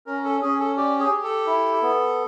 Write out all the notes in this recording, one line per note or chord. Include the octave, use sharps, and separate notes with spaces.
C#4 A#4
A4
C#4 G#4
A4
G4 D5
G#4
G4
A4
E4
B3